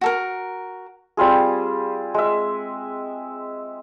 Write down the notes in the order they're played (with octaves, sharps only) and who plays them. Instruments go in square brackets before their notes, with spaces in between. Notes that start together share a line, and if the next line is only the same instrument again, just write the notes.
[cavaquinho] F#4 A4 A#4
[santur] G3 C4 F4 G#4
G#3 E5